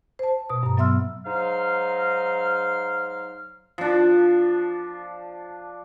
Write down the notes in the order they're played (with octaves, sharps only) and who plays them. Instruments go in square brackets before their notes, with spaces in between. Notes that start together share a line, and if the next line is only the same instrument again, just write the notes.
[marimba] C5 A5
B2 D#6
G2 A#5
F#3 B3 E5 C6 E6 F6
[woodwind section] G#2 F#3 D#4 F5 C6 F6
[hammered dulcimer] F3 D4